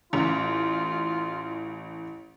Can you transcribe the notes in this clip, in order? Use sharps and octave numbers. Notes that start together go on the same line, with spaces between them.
A1 F4